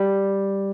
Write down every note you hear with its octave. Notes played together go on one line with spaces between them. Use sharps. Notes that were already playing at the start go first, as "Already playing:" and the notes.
Already playing: G3